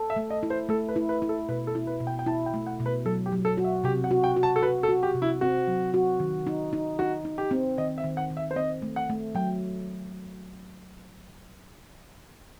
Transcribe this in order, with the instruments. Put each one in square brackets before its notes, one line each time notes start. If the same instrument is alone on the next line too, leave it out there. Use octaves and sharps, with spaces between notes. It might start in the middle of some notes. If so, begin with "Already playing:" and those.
Already playing: [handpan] A4
[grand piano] E5
[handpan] A3
[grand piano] D#5
[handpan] E4
[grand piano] C5
[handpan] A3 [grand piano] A4
[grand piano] B4
[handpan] E4
[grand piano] B4
[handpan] E4
[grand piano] A4
[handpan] B2 [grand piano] B4
[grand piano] A4
[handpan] E4
[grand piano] B4
[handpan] B2
[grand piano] G5
G5
[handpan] E4 [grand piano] A5
[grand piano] G5
[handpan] A3
[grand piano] F#5
[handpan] B2
[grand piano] B4
[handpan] F#3 [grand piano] A4
[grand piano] G4
[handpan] F#3
[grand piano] A4
[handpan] F#4
[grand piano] E5
[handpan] C3 [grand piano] G4
[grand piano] F#5
[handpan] F#4
[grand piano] G5
[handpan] F#4
[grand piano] A5
A4
[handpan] F#4 [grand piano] B4
[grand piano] A4
[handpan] F#4
[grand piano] G4
[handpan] C3
[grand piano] E4
[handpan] C4 [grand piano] F#4
[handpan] F#3
F#4
D#3
D#4
D#4
[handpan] D#4 [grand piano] F#4
[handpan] D#4
[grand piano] G4
[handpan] C4
[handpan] D#3 [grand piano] D#5
[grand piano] E5
[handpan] D#3
[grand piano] F#5
[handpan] D#3
[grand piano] E5
C5
[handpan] C4 [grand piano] D#5
[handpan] A3
[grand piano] F#5
[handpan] A3
[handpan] F#3 [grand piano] G5